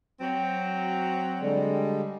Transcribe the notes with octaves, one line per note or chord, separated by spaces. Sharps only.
F#3 C4
D3 G3 G#3